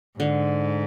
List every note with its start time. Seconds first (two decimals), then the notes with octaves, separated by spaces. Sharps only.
0.20 G#2 D3